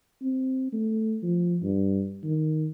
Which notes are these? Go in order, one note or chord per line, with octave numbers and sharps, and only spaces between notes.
C4
A3
F3
G2
D#3